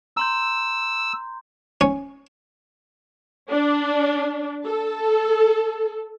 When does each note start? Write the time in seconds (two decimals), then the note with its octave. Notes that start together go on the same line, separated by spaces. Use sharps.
0.17 A#5 C6 E6 G6
1.81 C#4
3.51 D4
4.66 A4